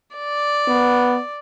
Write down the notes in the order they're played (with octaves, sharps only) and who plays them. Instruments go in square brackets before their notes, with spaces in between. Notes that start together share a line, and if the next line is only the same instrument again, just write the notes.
[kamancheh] D5
[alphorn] B3